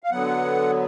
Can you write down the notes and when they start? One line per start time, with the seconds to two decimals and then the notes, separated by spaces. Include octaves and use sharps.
0.03 F5
0.11 D3 F#3 B3 F#5